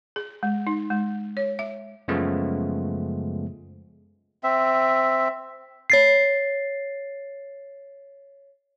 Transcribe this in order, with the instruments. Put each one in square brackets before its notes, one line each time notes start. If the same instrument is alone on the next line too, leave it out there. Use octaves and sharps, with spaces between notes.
[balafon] G#4
G#3
D#4
G#3
C#5
E5
[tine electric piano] F#2 C#3 F3 G#3 A3 B3
[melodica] C4 E5
[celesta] C#5 A6 C7